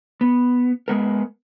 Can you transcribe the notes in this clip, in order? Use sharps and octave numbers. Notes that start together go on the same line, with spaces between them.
B3
G#3 B3 A#4